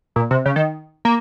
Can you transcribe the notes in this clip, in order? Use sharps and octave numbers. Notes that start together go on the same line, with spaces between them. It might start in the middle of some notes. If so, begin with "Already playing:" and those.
A#2
C3
C#3
D#3
A#3